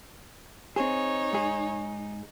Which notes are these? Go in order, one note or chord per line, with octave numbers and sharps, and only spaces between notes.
C4 D#4 G#4 C#5
G#2 G#4